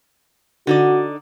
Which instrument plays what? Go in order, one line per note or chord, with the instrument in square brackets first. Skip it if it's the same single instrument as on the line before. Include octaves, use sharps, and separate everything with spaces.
[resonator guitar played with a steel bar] D3 D#4 D5 [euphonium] F#4